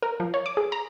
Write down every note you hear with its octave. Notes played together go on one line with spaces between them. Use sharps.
A#4
F3
C#5
D6
G#4
A#5